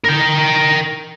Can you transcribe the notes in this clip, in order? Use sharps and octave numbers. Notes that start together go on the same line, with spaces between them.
A#4 G5